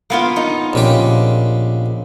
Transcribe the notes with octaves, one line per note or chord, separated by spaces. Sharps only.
A#3 B3 F4
D#4
A#1 C#3 G4